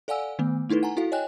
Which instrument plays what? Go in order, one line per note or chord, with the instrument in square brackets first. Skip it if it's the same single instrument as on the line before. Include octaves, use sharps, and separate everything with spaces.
[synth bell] A4 D5 F5 F#5 G#5 E6
D#3 A3 B3
A3 D#4 E4 A4 B4
F#5 G#5 A#5
E4 F#4 A4 F5
C#5 D#5 G5 G#5 F#6